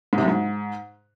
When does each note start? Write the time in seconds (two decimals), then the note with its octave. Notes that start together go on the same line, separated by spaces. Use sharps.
0.13 G#2
0.18 C3
0.23 F#2
0.28 G#2